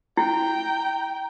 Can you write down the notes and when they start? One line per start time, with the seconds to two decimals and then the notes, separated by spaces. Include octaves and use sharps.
0.17 E4 G5 A#5